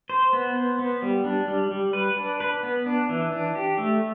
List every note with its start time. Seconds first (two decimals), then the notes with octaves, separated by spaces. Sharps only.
0.10 C5
0.33 B3
0.56 C5
0.79 B3
1.02 G3
1.25 D4
1.48 G3
1.71 G3
1.93 B4
2.17 D4
2.40 B4
2.63 B3
2.86 D4
3.09 E3
3.32 D4
3.55 G4
3.78 A3